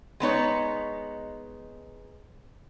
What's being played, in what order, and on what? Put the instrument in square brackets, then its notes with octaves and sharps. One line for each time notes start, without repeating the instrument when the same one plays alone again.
[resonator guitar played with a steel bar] G#3 B3 D#4 C#5